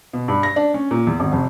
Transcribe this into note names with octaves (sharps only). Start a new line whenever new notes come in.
B2
G2
A#6
D4
C#4
A#2
E2
G#1
F1